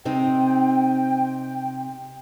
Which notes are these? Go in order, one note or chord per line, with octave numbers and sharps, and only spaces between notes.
C3 C4 D#4 G5